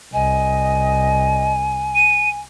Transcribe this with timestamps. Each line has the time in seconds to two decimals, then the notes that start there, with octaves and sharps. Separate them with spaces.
0.13 C2 D#5 G#5
1.95 D#7